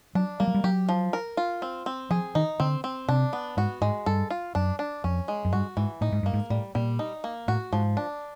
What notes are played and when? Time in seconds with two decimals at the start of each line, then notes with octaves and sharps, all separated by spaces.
0.15 F#3 D4
0.40 G3 A#3
0.47 F#3
0.54 G3
0.64 F#3 G4
0.89 F3
1.13 A#4
1.37 F4
1.62 C4
1.86 C4
2.10 F3 G#4
2.35 D#3 D#4
2.60 D3 C4
2.84 C4
3.08 C3 D4
3.33 B3
3.57 G#2 F#4
3.81 G#2 G#3
4.06 G2 A4
4.30 F4
4.55 F#2 D4
4.79 D4
5.04 F2 C#4
5.28 G#3
5.45 F#2
5.53 G2 F#4
5.77 G#2 E3
6.01 A2 D#4
6.12 G#2
6.23 G2 A#3
6.34 G#2
6.50 A2 G3
6.75 A#2 G3
6.99 D#4
7.24 A#3
7.48 A2 F#4
7.73 G#2 F3
7.97 D4